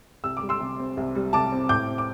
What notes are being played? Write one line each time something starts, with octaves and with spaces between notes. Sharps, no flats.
C2 E6
D6
G3
C6 E6
C3
C4
C2
G3
C3 A5 D6
C4
A2 D6 G6
C4
D6